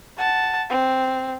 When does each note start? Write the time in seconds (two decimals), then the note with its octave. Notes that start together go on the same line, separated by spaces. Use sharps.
0.17 F#5 A5
0.70 C4